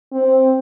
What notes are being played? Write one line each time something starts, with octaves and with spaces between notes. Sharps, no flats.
C4